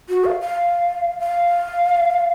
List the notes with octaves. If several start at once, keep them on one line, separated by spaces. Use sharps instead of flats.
F#4
F5
F5
F5